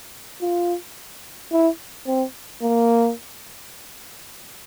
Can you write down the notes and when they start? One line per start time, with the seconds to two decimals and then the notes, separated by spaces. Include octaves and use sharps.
0.42 F4
1.52 E4
2.07 C4
2.62 A#3